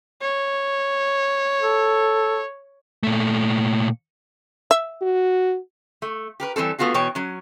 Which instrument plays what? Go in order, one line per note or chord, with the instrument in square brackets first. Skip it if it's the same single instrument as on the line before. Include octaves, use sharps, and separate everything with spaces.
[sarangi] C#5
[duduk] A4
[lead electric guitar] A#2 A3
[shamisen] E5
[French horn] F#4
[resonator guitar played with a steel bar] A3
G4 A#4 B4
E3 G3 C4 A4
A3 B3 F4 F#4 G#4
B2 E3 C#5 G5
F#3 C#4